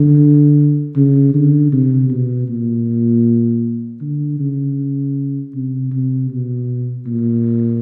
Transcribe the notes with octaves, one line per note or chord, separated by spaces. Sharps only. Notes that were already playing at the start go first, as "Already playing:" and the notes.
Already playing: D3
C#3
D3
C3
B2
A#2
D3
C#3
C3
C3
B2
A#2